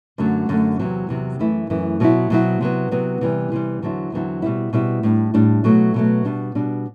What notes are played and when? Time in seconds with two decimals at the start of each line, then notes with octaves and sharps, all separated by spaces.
0.18 F#2 D3 F#3 A3
0.49 F#2 D3 F#3 A3
0.79 E2 C3 F#3 C4
1.09 E2 C3 F#3 C4
1.39 F#2 E3 A3 E4
1.70 F#2 E3 A3 E4
2.00 B2 F#3 C4 E4
2.30 B2 F#3 C4 E4
2.61 C3 F#3 B3
2.91 C3 F#3 B3
3.21 C3 E3 G3
3.52 C3 E3 G3
3.82 E2 D3 F#3 C4 E4
4.12 E2 D3 F#3 C4 E4
4.42 B2 G3 C4 E4
4.73 B2 G3 C4 E4
5.03 A2 G3 D4
5.34 A2 G3 D4
5.64 B2 F#3 A3
5.94 B2 F#3 A3
6.25 B2 G3 D4
6.55 B2 G3 D4